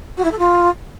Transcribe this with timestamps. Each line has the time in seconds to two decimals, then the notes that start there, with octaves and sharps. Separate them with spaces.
0.17 F#4
0.24 E4
0.31 A4
0.38 F4